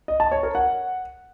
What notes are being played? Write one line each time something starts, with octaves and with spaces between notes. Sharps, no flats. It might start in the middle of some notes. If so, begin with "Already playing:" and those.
D#5
A5
C#5
A#4
F#5